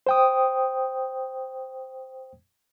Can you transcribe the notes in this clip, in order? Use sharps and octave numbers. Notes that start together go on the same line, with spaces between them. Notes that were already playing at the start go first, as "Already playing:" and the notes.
C5 G5 D#6